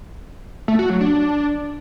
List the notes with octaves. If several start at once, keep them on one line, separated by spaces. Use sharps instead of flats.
A3
F#4
F#3
D4